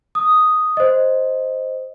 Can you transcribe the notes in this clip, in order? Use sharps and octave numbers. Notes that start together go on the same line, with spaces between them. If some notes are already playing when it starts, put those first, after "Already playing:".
D#6
C5 D#5